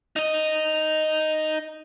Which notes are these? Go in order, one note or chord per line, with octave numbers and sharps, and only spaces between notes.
D#4 D#5